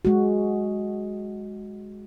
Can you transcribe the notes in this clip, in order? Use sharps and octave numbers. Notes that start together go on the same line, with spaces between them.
G#3 F#4